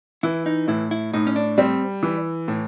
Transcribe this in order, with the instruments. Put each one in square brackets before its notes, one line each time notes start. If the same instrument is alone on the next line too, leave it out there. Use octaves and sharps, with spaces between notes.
[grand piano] E3 [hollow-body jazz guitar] E4
[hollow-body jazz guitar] D#4
[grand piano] A2 [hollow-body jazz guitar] E4
[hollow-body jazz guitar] E4
[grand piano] A2 [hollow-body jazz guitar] D#4
[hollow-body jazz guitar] C#4
D4
[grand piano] G3 [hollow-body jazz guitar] C4
[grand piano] E3
A2